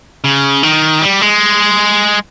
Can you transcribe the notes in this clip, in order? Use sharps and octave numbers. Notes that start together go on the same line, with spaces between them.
C#3
D#3
G3
G#3